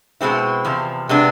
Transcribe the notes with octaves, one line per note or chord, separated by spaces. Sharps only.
B2 G#3 C4 E4
E2 C3 F3
C3 G#3 B3 D4